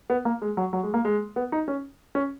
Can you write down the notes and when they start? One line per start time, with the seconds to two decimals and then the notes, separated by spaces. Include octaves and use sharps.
0.10 B3
0.25 A#3
0.42 G#3
0.57 F#3
0.73 F#3
0.83 G#3
0.94 A#3
1.05 G#3
1.36 B3
1.52 D#4
1.68 C#4
2.15 C#4